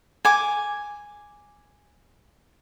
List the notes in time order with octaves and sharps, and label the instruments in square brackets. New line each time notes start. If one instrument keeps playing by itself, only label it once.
[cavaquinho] G#5 D6